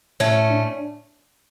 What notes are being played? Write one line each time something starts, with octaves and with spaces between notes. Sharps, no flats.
A2 A3 C#4
D4